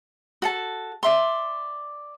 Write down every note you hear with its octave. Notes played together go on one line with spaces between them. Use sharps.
F#4 A4 A5
D5 E5 C6